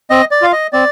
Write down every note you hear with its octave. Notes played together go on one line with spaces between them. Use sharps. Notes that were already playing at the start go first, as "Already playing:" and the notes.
C4 D#5
D5
F4 F5
D#5
C4 D5